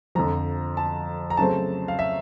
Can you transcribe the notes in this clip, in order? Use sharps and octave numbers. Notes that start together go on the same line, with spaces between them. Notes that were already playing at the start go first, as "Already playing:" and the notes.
F2 D3 F3 A#5
A5
A#5
C#3 F#3 A3 C4 A5
F5
E5